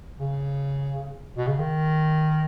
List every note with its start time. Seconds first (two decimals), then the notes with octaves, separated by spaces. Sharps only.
0.20 C#3
1.37 B2
1.47 C#3
1.59 D#3